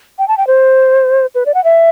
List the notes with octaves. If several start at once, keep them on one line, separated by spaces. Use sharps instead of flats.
G5
A5
G5
C5
B4
D5
F#5
E5